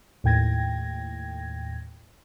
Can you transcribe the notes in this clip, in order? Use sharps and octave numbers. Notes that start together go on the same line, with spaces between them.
D#2 A2 G5 G#6 A#6